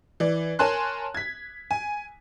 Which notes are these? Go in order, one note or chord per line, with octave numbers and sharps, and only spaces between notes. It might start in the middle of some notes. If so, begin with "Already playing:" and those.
E3 D5
A#4 C#5 G#5 A5 C6 F#6
G#6 B6
G#5